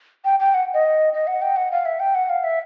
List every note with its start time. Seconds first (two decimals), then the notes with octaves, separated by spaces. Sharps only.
0.25 G5
0.40 G5
0.54 F#5
0.74 D#5
1.13 D#5
1.27 F#5
1.42 G5
1.56 F#5
1.72 F5
1.85 E5
2.00 G5
2.15 F#5
2.30 F5
2.44 E5